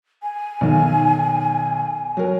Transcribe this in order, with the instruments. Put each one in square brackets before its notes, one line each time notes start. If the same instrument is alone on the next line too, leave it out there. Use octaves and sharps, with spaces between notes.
[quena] G#5
[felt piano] B1 D#3
F#3 A#4